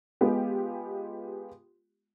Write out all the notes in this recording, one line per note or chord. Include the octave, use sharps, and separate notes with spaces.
G#3 B3 F4 G4